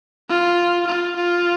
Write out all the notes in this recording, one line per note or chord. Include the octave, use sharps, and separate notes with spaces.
F4
F4
F4